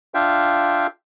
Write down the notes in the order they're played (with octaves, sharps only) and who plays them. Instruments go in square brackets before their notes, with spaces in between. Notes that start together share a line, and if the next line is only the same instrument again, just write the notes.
[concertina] D4 F4 E5 F5 G5